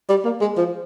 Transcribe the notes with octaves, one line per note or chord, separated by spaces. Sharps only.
G3
A#3
G#3
F3